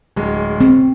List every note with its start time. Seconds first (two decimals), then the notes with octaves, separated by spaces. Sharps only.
0.16 D1 G#3
0.61 C4